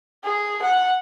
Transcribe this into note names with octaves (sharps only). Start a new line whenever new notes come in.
G#4
F#5